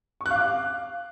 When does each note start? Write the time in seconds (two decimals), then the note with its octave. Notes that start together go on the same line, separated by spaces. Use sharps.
0.21 C#6
0.26 F#6
0.31 F5
0.36 D6
0.41 F5